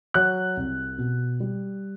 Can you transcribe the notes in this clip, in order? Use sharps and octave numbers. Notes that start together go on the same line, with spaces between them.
F#3 F#6
C2
B2
G3